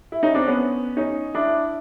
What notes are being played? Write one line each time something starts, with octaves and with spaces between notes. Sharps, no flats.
E4
C#4 D#4
C4 D4
B3 C#4
C#4 D#4
D4 E4